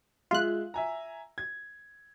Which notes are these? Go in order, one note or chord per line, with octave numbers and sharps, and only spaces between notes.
G#3 F4 E5 F#6
E5 G#5 A#5
G#6